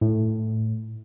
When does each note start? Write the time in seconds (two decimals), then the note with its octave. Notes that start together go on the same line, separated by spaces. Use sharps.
0.01 A2